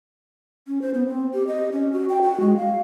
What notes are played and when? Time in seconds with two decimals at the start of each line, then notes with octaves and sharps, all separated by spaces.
0.67 C#4
0.82 C5
0.94 B3
1.07 C4
1.34 G4
1.47 D#5
1.72 C#4
1.92 F#4
2.09 G5
2.22 F#4
2.40 G#3
2.57 F5